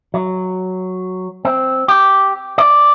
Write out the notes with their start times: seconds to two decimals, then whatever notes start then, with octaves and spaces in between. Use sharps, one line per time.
0.14 F#3
1.45 C4
1.88 G4
2.58 D5